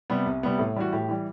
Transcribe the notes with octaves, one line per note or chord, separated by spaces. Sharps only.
C3 G3 B3
C2
C3 G3 B3
A2
E3 G3 F#4
A2 G4
E3 G3